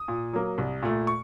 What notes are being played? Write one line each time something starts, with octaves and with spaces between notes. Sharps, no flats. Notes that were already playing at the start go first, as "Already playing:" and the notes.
Already playing: D#6
A#2
F#3 A#3
C2
A#2 A3
C#6